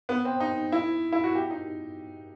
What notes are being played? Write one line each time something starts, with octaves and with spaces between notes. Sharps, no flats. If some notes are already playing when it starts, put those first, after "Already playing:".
B3
C4
D#4
E4
E4
F#4
G4
D#4